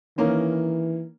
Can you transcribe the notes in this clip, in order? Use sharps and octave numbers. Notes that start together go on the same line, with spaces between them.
D#3 E3 A#3 C#4